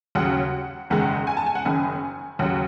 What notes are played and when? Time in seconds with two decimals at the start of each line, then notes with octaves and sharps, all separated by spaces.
0.15 D#2 C#3 F#3 F#5
0.90 F#1 E2 D#3 G#3 F#5
1.27 G#5
1.37 A5
1.46 G#5
1.55 F#5
1.65 F#1 F#2 D#3 G#5
2.39 D#2 C#3 F#3 F#5